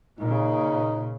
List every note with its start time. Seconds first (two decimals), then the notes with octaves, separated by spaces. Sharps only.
0.20 A#2 C#3 D#4